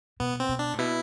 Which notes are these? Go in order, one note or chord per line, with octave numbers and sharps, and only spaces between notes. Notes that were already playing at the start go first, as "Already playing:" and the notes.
B2 B3
C4
B2
D4
A2
B2 E4